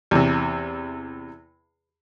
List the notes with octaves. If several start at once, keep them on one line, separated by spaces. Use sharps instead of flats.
E2 C3